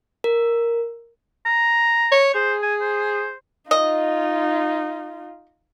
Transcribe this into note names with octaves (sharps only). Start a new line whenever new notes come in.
A#4
A#5
C#5
G#4 C5
G#5
C5
D#4 F4 D#5